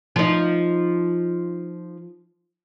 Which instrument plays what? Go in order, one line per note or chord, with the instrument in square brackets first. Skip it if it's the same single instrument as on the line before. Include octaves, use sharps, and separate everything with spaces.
[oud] F3 D#4